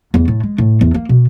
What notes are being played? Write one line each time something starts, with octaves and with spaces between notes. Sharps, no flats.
E2
A2
G#3
A2
E2
A#3
B2